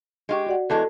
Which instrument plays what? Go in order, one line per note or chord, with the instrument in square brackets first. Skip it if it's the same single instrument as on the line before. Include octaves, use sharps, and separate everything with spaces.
[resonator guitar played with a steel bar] G#3 F4 G4
[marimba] F#4 D5 F#5
[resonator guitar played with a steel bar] E2 E3 G#3 [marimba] A4 A5